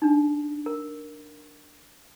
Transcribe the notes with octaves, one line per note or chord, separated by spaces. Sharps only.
D4 D#4
A#4